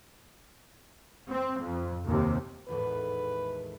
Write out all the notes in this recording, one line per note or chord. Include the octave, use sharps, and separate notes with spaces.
C4
F2
D#2 C3
G#1 E2 A2 B4